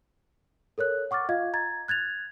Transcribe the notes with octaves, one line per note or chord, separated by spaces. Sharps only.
A4 A#4 C#5 F#6
F#5 C#6 D6 F6 A6
F4 D#5 F5 G#6
A#5 G#6 A6
F#6 G#6 A6 F7